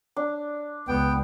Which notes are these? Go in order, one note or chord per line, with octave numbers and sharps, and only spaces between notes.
D4
C#2 B3 G5